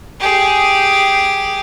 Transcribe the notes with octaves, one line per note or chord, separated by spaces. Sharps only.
G4 G#4